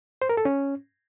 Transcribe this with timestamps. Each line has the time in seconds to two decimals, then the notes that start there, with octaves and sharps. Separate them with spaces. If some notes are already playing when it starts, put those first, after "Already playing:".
0.22 C5
0.29 A#4
0.37 A4
0.45 C#4